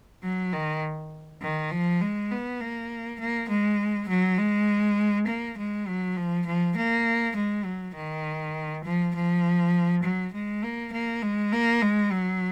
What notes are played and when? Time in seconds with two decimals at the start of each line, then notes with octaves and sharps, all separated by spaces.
0.23 F#3
0.53 D#3
1.42 D#3
1.71 F3
2.01 G#3
2.31 B3
2.61 A#3
3.20 A#3
3.49 G#3
4.09 F#3
4.38 G#3
5.28 A#3
5.58 G#3
5.87 F#3
6.17 F3
6.47 F3
6.77 A#3
7.36 G#3
7.65 F#3
7.96 D#3
8.85 F3
9.15 F3
10.03 F#3
10.33 G#3
10.63 A#3
10.93 A#3
11.23 G#3
11.53 A#3
11.82 G#3
12.12 F#3